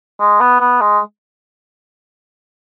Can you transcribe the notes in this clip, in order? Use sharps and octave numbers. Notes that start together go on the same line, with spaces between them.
G#3
B3
B3
G#3